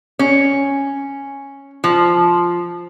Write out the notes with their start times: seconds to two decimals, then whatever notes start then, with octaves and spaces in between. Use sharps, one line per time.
0.19 C#4
1.84 F3